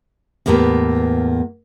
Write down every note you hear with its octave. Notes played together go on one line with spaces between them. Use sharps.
E2 A2 A#3 B3 G4 B4